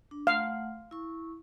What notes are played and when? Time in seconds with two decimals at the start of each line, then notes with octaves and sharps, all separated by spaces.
0.11 D4
0.27 A3 F5 F#5
0.91 E4 C#6